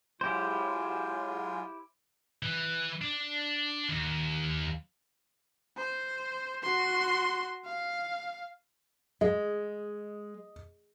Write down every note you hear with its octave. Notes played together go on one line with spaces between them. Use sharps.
F#3 G#3 E4 F4 G4 C5
E3
D4
D#2
C5
F#4 C6
F5
G#3 D#5